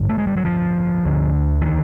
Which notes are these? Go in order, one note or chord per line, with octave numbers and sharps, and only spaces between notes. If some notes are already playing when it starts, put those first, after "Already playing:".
Already playing: A1 G2 D3
A3
G#3
G3
F#3
F3
D2 D3
E3
D#3